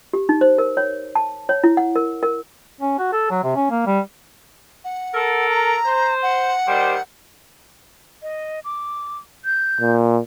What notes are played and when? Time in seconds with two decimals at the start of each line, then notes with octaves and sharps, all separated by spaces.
0.13 G4
0.29 D#4
0.41 C5
0.58 A#4
0.77 C#5
1.15 A5
1.49 C#5
1.64 E4
1.77 F#5
1.96 A#4
2.23 A#4
2.81 C#4
2.99 F#4
3.12 A4
3.30 F#3
3.44 C3
3.56 C#4
3.71 A#3
3.86 G3
4.84 F#5
5.14 A4 A#4
5.50 A#5
5.85 C5
6.22 F#5
6.67 D#3 G3 C5
8.22 D#5
8.65 D6
9.45 G6
9.81 A#2